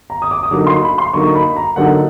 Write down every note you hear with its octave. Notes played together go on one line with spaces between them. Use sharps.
A#5
D#6
D6
D#6
D3 F#3 A#3 D#4 D6
C6
B5
C6
D3 F#3 A#3 D#4 C#6
B5
A#5
D3 F#3 A#3 D#4 F#5